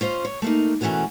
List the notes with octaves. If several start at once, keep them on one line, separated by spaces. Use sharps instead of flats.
C#4 F4 C5 D#5
C#5
A3 A#3 D#4
B2 E3 A3 C#4 F#4 A#4